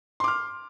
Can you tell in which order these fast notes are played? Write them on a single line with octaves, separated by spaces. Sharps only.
C6 D6 F6